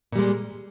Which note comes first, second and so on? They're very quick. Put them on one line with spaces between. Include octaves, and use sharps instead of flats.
A#2 G3 G#3